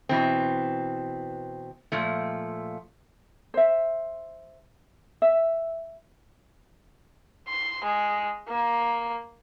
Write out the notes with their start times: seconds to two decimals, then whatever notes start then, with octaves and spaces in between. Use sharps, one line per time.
0.09 B2 E3 C4
1.92 A#2 F3 A3
3.54 C5 E5
5.22 E5
7.48 C6
7.84 G#3
8.49 A#3